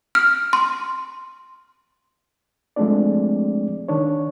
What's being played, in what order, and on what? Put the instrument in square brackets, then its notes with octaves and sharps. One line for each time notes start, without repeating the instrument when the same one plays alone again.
[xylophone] F6
C6
[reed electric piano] F3 G#3 A3 C4 D4 D5
D#3 D4 C#5